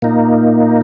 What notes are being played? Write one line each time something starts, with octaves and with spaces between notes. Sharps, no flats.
A#2 A#3 D#4